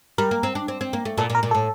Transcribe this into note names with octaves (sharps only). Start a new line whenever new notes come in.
G3 A#4
A#3
C4
D4
C4
C4
A#3
A3
A#2 A4
A#2
A#4
A#2
A2 A4